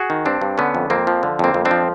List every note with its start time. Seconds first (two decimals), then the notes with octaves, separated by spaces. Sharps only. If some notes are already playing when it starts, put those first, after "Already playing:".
Already playing: F#4 G#4
0.10 D#3
0.25 G2 C4 D4
0.41 G2
0.58 D3 B3 C#4
0.75 F2
0.90 F2 A#3 C4
1.07 F3
1.23 D3
1.39 F2 A#3 C4
1.54 F2
1.65 C4 D4
1.71 F3